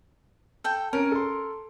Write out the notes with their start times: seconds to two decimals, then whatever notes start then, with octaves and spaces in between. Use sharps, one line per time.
0.64 A4 G5
0.93 C#4 A#4 D7
1.12 A4 C6